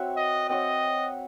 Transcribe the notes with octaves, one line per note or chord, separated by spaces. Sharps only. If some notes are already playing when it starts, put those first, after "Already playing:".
Already playing: C4 F#4 C#5 E5
D#5
C4 F#4 C#5 D#5 E5